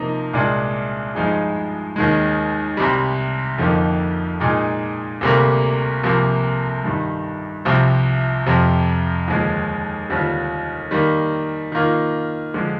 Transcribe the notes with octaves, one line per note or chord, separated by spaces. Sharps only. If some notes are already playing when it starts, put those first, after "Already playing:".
Already playing: C3 F3 A#3 D#4
C2 A#2 G#3 D4
G2 F3 G#3 D#4 G#4
D#2 D#3 G#3
C2 C3 G3
F2 D3 F3 A#3 D#4
A#2 G#3 D#4 G#4
D2 C3 G3 A#3
C2 C3 F3 A#3
G2 D#3 G3
C2 C3 F3
F2 C3 F3
D#2 D3 F3 G#3
D#2 D3 G3 C4 F4
D#3 G3 A#3
D#3 A#3 F4
D3 F3 G#3